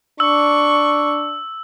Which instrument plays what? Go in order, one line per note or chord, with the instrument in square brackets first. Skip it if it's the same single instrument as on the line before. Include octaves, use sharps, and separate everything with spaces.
[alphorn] D4 [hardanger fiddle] C#6 [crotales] E6